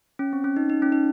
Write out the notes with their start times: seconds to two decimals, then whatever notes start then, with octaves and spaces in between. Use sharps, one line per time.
0.19 C#4
0.33 C4
0.44 C#4
0.57 D#4
0.70 D#4
0.82 C#4
0.92 D#4